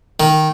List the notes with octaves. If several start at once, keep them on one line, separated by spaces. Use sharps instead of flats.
D#3